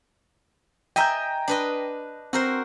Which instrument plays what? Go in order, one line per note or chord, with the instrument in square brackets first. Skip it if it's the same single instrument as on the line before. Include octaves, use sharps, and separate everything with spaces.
[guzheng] D#5 E5 G#5 [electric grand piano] G5 A#5 G6
[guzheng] D4 B4 D#5
[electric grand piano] C4 [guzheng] F#4 A#4 C5